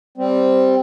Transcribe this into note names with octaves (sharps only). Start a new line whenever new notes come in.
G3 C4